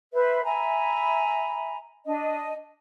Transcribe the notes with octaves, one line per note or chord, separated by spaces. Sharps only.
B4 C5 E5
E5 G#5 A#5 B5
D4 D#5